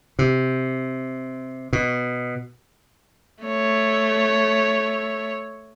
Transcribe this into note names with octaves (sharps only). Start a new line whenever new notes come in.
C3
B2
A3 C#5